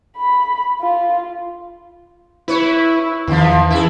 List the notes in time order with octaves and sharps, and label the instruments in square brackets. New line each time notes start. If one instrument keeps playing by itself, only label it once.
[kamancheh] B5
F4
[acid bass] E4 [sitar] B4 C#5
[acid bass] E2 [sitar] D#3 F3
[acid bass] E3 [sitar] E4 G#4